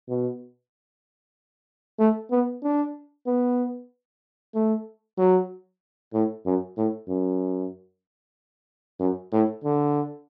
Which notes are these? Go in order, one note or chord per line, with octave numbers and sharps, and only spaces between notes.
B2
A3
B3
D4
B3
A3
F#3
A2
F#2
A2
F#2
F#2
A2
D3